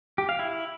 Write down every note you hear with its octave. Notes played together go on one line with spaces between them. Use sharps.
G4
F5
E4